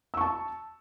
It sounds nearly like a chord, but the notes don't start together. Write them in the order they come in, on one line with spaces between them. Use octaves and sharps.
E6 C#6 A5